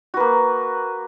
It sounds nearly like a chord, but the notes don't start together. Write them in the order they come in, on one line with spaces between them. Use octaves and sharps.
F#4 B4 A#3